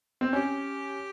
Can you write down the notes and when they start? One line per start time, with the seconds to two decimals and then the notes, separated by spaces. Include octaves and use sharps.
0.21 C4
0.33 C#4 G4